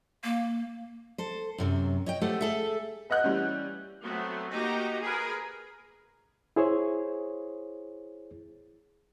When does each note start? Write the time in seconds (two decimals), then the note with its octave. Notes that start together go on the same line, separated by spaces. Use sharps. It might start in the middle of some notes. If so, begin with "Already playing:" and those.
0.24 A#3
1.18 A4 C5
1.58 F#2 C3 F#3
2.06 C#5 D#5 G5
2.21 G#3 A3 G4 A4 C5 F#5
2.41 G#4 A4 E5
3.10 B4 D#5 F#5 F#6 G6
3.24 E3 G3 C#4
4.04 F#3 A3 B3 C4
4.51 A#3 D#4 F#4 G4 A#5
5.03 G#4 A#4 B4
6.56 E4 G#4 C5 C#5